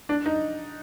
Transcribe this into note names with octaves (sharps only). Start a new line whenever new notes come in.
D4
D#4